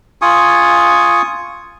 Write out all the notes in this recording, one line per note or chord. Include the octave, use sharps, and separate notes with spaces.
F4 G#5 C#6 D#6